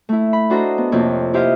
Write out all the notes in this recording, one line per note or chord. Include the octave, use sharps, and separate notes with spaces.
A3 E4
B5
D4 F#4 A4 C5 D#5 A#5
B3
F2 C3 A#3 C#5
E4 G4 C5 D#5 F5